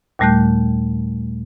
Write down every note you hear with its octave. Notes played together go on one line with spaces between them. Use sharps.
D#2 A#2 G3 A3 F#6 G6